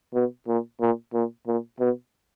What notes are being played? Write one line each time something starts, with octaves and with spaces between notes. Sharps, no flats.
B2
A#2
A#2
A#2
A#2
B2